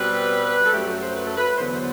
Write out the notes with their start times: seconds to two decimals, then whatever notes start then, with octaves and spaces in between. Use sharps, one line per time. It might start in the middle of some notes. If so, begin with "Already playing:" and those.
Already playing: B2 G3 C4 B4
0.65 A4
0.73 F#2 F#3 A3 G4
0.87 F#4
1.01 C5
1.16 B4
1.27 A4
1.37 B4
1.58 E2 D3 F#3 B3 C5
1.74 C5